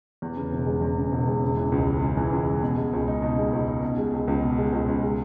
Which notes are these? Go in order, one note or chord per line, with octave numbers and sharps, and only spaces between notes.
E2
C#3
E1
G#3
E2
C#3
E1
G#3
C#3
E3
C#2
G#3
C#3
E3
C#2
G#3
B2
G#3
C#2
D#4
B2
G#3
C#2
D#4
B2
G#3
C#2
C#2
B2
G#3
C#2
C#2
G#3